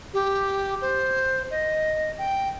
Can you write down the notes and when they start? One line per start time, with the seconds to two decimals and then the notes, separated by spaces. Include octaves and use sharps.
0.14 G4
0.81 C5
1.51 D#5
2.18 G5